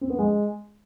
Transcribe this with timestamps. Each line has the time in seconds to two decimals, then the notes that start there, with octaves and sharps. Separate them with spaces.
0.01 C4
0.10 B3
0.19 G#3